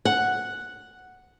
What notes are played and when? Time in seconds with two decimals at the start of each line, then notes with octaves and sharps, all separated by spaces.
0.05 F#5